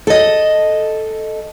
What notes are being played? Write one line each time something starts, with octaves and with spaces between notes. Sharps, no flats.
A4 D#5